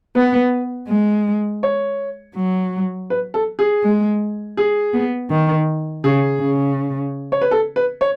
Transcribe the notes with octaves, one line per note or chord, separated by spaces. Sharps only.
B3 B4
G#3
C#5
F#3
B4
A4
G#4
G#3
G#4
B3
D#3
C#3 G#4
C#3
C#5
B4
A4
B4
C#5